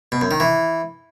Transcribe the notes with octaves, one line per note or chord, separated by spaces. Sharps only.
B2
F#2
D#3
E3